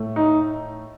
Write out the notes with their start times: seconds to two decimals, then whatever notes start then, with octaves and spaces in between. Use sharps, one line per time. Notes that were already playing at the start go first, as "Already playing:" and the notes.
Already playing: A2 A3
0.16 D#4